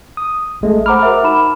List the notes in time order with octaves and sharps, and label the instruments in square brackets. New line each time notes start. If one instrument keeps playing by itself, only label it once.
[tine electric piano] D#6
A1 G#3 A3
[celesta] C5 A#5 B5 [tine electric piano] F#5 D6 F6
[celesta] F#4 A#4 E5
D#4 B5 E7